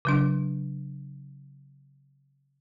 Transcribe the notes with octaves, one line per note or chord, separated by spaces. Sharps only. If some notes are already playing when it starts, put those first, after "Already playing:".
C#3 F#3 D4